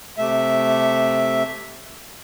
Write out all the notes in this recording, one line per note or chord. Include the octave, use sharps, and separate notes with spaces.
C3 A3 E5